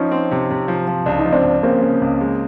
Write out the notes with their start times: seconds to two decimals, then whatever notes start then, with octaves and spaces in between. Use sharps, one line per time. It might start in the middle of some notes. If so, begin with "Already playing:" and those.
Already playing: F3 C#4 D#4
0.11 C4
0.31 C3
0.50 C3
0.68 F3
0.87 F3
1.06 C#2 D4
1.19 D#4
1.25 F3
1.32 C4 D4
1.44 C#2
1.63 C#3 A#3 C4
1.82 C#3
2.01 C#2
2.21 G#3